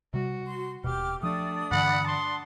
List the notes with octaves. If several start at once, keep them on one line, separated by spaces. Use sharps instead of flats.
C3 G3 F#4
C6
D#1 B2 G4 G5 D6 F6
F3 A3 D4 D5 D#6
G2 D3 E3 F#5 B5
A5 C6